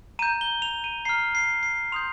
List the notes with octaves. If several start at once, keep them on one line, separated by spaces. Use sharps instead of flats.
A#5 G6 D#7
G7
F7
D#7
A#5 F6 C7
C7
C7
C6 D#6 G6 F7